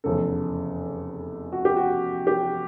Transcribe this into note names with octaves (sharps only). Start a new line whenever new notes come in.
F1 E2 C#3 A4
F#4
G4
F#4
G4